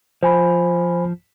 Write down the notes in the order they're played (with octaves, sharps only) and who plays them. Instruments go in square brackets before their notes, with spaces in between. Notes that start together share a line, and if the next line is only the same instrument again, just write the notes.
[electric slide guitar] F3 [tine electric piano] C5 G#5 B5